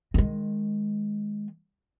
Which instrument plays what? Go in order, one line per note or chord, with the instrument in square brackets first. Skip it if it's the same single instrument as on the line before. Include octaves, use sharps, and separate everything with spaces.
[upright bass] D#3 G#3